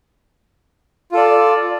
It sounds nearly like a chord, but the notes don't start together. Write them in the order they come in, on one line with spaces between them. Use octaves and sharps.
F4 A4 D5